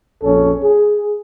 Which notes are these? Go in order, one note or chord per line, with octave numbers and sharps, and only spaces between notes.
A#1 F2 C#4 A4
G#4